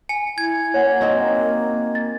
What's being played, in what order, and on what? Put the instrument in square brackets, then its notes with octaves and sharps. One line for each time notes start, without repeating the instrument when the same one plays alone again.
[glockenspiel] G#5 [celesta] C#7
[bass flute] E4 [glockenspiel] G#6
[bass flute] A#3 [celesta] C#5 F#5 G#5
[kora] C4 D#4 F#4
[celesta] A6